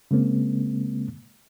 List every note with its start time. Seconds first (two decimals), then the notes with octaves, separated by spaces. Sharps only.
0.11 C#3 G#3 A#3 C4